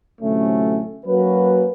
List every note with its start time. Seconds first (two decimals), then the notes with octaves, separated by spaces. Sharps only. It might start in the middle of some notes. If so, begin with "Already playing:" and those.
0.21 D2 A2 C3 F#3 A3 C#4
1.06 F#3 A#3 C#4 F#4 B4